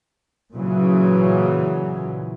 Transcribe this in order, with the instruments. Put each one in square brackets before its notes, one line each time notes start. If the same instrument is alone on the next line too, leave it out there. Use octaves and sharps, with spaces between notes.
[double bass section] A#2 C#3 E3 F#3